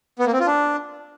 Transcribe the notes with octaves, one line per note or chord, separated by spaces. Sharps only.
B3
A#3
C4
F4
D4